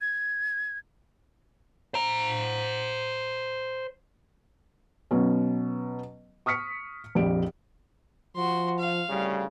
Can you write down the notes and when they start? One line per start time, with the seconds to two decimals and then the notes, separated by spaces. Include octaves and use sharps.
0.01 G#6
1.94 C5 A#5
5.11 B2 F#3 C#4
6.46 C#6 D#6 F6 B6 C#7
7.15 A#1 F2 G4 D7
8.36 F3 F#4 C6
8.79 F5
9.09 D2 A2 C#3 G3